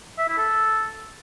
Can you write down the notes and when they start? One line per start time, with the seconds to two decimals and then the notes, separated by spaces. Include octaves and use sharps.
0.18 E5
0.28 E4
0.38 A4